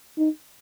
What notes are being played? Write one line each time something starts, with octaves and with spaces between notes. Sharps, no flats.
D#4